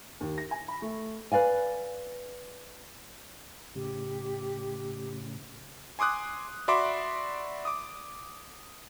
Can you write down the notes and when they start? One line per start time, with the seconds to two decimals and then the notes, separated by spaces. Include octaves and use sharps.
0.21 D#2
0.38 A#6
0.51 G#5
0.68 B5
0.82 A3
1.32 B4 D5 F5 G#5
3.75 A2 C#3 G4
5.99 G#5 C6 D6 D#6 F#6
6.68 F#4 D5 E5 B5 C6 D6
7.65 D6 D#6